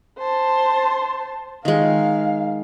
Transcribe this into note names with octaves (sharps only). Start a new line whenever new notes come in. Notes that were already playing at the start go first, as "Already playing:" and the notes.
C5 A5
D#3 G#3 F5